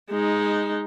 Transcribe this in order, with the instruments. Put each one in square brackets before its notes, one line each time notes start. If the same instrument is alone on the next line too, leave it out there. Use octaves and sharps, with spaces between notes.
[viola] G#3 D#4